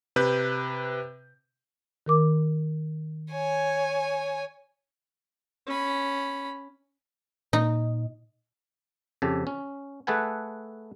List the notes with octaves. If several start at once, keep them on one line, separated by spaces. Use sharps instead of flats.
C3 B4 G6
D#3 A#4 D6
C#5 G#5
C#4 B5
A#2 D#4
F2 C#3 G4 A4
C#4
A3 G#4 A4 B4 F#5 G#5